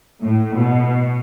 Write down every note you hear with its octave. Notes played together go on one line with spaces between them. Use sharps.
A2
B2